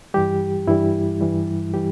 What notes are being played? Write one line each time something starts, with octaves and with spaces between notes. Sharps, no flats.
G2 E3 G3 G4
G2 E3 G3 E4
G2 E3 G3
E3 G3 G4